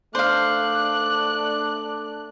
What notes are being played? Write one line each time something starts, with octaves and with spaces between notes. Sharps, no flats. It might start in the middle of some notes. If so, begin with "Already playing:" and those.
A3 D4 C5 F5 D6 F#6